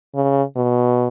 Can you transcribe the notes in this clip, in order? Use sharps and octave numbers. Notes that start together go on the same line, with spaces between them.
C#3
B2